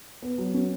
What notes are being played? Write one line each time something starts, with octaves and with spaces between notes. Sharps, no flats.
B3
F#3
C#4